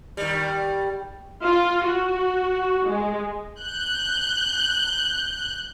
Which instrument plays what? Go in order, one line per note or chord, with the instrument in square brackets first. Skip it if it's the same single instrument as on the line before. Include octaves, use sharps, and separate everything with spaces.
[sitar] D#3 G3
[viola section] F4
F#4
G#3
[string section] F#6 G6